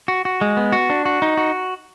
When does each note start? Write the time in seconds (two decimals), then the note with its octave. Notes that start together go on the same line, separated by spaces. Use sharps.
0.08 F#4
0.25 F#4
0.41 G#3
0.57 B3
0.72 F#4
0.90 D4
1.05 F#4
1.22 D#4
1.37 F#4